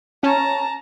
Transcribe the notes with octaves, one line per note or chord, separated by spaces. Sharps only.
C#4 A5 A#5